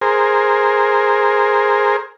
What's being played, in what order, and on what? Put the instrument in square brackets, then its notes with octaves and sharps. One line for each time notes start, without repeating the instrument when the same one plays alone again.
[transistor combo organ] G#4 A#4 C5